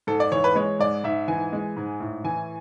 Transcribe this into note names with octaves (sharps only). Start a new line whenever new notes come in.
G#2 A4
D5
E3 C#5
B4
G#3 C#5
G#2 D5
G#2 E5
E3 G#5
G#3
G#2
A2
E3 G#5